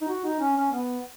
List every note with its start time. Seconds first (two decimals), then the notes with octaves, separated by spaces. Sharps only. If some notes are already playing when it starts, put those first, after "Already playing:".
0.01 D#4
0.08 F#4
0.24 D#4
0.40 C#4
0.57 C#4
0.71 B3